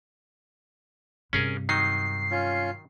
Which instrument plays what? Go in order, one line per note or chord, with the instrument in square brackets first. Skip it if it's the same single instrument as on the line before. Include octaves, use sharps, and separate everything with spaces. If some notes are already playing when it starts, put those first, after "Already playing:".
[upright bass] G2 C3 [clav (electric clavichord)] C#4 G#4 A#4
[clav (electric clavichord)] D#3 F#3 D#4 [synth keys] C7
[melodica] C#4 F4